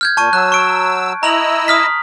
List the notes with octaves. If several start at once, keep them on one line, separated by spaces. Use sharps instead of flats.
F6 G6 G#6
A#2 A5 C#6 D#7
F#3 E6 F#6
C#6 D7
E4 D#5 A#5 E6 F7 F#7
D#6 F6 B6